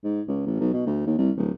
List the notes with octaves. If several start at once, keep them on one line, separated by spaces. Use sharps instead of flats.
G#2
C#2
A1
B1
B2
D2
D#2
C2
D1